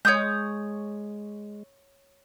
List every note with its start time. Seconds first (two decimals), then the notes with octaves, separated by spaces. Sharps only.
0.05 G#3 C#5 D#6 G6